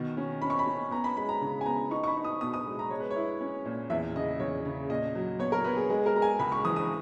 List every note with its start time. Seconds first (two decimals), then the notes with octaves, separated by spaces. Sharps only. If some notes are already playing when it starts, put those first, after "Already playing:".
Already playing: B2 D#3
0.17 C#4
0.41 C#4 B5
0.50 C#6
0.59 B5
0.66 C#4
0.91 B3 A#5
1.04 B5
1.17 G#3 B5
1.29 A#5
1.41 C#3
1.61 G#5
1.66 B3 A#5
1.91 D#4 C#6
2.04 C#6
2.07 B5
2.17 D#4
2.24 D#6
2.41 B2 D#6
2.54 D#6
2.67 G#3
2.79 A#5
2.90 G#3 C#5
3.00 B4
3.10 C#5
3.16 E4
3.41 C#4
3.65 A#2
3.90 E2 E5
4.15 C#3 D#5
4.40 E2 C#5
4.65 C#3
4.89 A#2 D#5
5.15 F#3
5.39 B3 C#5
5.52 A#4
5.64 B3 B4
5.77 G#4
5.90 G#3 G#4
6.06 A#4
6.15 G#3 A#5
6.22 G#5
6.39 C#2 B5
6.52 C#6
6.65 E3 D#6
6.76 D#6